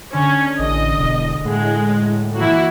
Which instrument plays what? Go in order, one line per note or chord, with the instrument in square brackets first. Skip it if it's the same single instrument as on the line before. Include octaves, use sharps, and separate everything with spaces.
[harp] D3 [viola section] C#4
[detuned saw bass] A1 [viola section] D#5
[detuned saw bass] E1
[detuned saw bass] A2 [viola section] G#3 [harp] F#5 G#5
[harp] E3 A#3 [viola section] E4 F#4